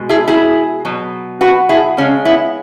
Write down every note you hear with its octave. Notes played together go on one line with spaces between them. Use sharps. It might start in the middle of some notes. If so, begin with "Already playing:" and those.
Already playing: B2 G#3
E4 G#4
E4 G#4
B2 F#3
F#4 B4
E4 G#4
C#3 G#3 C#4
B3 E4